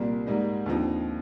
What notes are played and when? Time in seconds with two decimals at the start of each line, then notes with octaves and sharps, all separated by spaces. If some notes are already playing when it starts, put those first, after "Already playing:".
Already playing: C2 A#2 G3 A#3
0.27 G#2 G3 A#3 D#4
0.66 D#2 D3 F3 C4 D#4